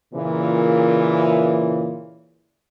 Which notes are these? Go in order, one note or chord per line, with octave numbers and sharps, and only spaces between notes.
A#2 C#3 E3